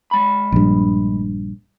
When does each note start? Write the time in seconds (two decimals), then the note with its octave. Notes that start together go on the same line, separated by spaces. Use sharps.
0.11 G#3 B5
0.52 A#1 G2